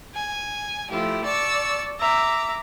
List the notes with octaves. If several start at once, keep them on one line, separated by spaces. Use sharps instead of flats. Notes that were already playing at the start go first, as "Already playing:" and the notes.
G#5
F3 A3 E4 G4
D5 A5 C#6 E6
E5 A#5 D6